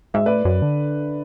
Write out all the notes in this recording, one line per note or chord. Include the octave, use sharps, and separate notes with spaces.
G#2 E5
A2 B4 D5
F#2
D3